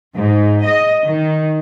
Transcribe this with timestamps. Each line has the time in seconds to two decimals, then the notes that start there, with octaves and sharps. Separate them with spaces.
0.14 G#2
0.63 D#5
1.05 D#3